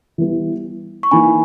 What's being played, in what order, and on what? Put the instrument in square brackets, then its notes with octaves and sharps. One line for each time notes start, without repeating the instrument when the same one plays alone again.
[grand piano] E3 G3 B3
[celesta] C#6
[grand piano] E3 A#3 D#4 [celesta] G#5 B5